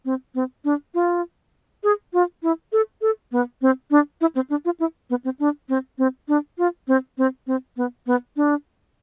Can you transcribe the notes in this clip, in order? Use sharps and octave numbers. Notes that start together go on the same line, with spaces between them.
C4
C4
D4
F4
G#4
F4
E4
A4
A4
B3
C4
D4
E4
C4
D4
F4
E4
B3
C4
D4
C4
C4
D4
F4
C4
C4
C4
B3
B3
D4